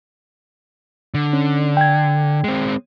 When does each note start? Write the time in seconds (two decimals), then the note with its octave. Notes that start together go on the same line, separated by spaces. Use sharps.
1.14 D3
1.33 C#4
1.77 G5 G#6
2.44 G#3 C4